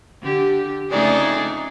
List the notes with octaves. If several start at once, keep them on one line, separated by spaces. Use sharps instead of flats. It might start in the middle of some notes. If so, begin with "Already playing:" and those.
D3 G4
F2 C#3 A3 D4 D#4 G#4 D5